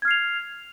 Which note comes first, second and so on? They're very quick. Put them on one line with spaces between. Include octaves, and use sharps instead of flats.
G#6 F6 C7 F7